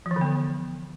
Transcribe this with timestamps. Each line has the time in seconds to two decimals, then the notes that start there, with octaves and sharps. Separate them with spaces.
0.06 F3
0.11 E3
0.16 D3
0.21 B3